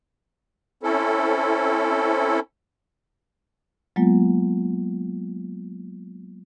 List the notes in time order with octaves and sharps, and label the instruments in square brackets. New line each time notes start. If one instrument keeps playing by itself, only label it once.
[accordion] C4 C#4 E4 A4
[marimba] F#3 G#3 A#3 B3 F4